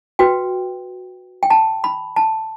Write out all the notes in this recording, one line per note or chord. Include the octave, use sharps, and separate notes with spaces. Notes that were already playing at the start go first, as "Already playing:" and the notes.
F#4 B4 G5
G5
A5
B5
A5